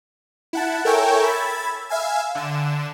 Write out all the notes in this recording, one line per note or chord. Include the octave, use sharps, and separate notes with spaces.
E4 F#5 A5
A4 A#4 C#5 E5 G5 G#5
B5 E6 G#6 A6
E5 F5 G#5 E6
D3 E7